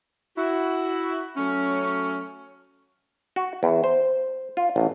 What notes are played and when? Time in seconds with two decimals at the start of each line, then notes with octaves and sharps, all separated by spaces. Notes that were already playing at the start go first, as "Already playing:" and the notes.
0.37 E4 F#4
1.37 F#3 A3 C#4
3.36 F#4
3.63 E2
3.84 C5
4.57 F4
4.76 A1